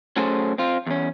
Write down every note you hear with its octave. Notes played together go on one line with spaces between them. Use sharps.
F#3 A3 C#4 G#4 A4 C5
C4 F4
E2 C#4